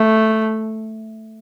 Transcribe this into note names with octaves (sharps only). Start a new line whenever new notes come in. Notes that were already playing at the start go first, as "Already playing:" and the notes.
Already playing: A3